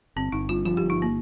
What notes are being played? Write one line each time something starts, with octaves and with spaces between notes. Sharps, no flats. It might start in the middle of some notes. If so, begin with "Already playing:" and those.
G1 C4
G1 D#4
G2 F4
F3 F4
G1 G4
D#4
A#3